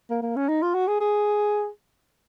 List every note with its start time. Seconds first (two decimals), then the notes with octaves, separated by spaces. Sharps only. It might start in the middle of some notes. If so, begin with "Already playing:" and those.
0.10 A#3
0.22 A#3
0.36 C#4
0.49 D#4
0.62 F4
0.74 F#4
0.88 G#4
1.00 G#4